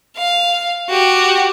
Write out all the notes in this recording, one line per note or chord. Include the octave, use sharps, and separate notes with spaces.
F5
F#4 G4